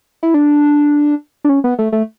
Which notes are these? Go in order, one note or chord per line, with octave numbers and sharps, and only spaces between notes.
E4
D4
D4
C#4
B3
A3
A3